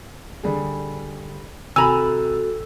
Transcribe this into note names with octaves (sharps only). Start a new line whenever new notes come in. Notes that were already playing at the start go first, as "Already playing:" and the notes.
D3 G3 G#4
C3 F#4 A4 G#5 A#5 B5 E6